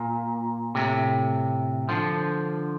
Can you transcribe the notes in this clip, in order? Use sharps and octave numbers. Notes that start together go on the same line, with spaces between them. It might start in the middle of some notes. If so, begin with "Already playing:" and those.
Already playing: A#2
A2 C3
D3 F3